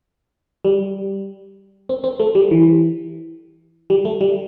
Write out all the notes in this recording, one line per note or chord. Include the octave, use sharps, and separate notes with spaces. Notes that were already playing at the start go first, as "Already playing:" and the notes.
G3
C4
C4
A3
G3
E3
G3
A3
G3